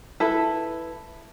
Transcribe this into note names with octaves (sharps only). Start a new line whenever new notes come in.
E4 A4 B4